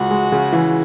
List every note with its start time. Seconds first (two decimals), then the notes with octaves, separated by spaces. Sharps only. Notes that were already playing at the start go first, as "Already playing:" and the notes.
Already playing: C#2 F#4
0.11 G#3
0.32 C#3
0.52 E3